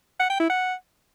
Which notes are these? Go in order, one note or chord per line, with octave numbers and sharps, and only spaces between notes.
F#5
G5
E4
F#5